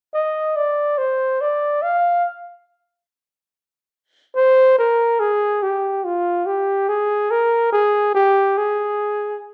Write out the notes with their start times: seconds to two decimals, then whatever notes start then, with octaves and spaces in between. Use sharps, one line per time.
0.14 D#5
0.56 D5
0.98 C5
1.41 D5
1.82 F5
4.36 C5
4.78 A#4
5.20 G#4
5.62 G4
6.04 F4
6.46 G4
6.89 G#4
7.31 A#4
7.72 G#4
8.14 G4
8.58 G#4